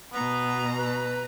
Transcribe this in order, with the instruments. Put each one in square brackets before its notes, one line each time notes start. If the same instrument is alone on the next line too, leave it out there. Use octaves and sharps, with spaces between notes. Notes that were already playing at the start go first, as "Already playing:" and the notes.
[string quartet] B2 A#5 [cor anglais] B3
[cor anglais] B4